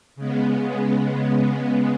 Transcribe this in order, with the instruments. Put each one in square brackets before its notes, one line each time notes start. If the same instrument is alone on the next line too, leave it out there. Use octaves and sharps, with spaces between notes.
[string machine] C#3 G#3 B3